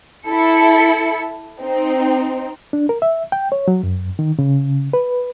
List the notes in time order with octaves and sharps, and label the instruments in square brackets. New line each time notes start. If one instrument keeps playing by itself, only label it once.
[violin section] E4 A4 C#7
C4 D#4
[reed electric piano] D4
A#4
E5
G5
C#5
F#3
F#2
D#3
C#3
B4